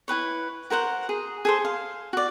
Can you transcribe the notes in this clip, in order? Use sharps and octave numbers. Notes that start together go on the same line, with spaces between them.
E4 G4 B4 C#5
F#4 A#4 C5 F#5
G#4
G#4 A4 C5
F5
F#4 D5